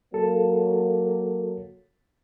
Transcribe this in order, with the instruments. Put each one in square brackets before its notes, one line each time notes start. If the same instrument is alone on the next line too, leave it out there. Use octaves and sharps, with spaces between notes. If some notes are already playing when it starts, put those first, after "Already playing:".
[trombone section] F#3 A#3 [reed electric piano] A4